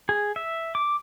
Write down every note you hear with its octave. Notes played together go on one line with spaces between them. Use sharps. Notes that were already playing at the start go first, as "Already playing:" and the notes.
G#4
E5
D6